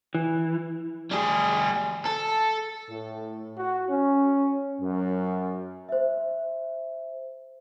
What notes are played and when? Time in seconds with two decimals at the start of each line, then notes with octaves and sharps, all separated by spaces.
0.15 E3
1.12 G3 G#4
2.05 A4
2.88 A2
3.56 F#4
3.89 C#4
4.81 F#2
5.89 C5 E5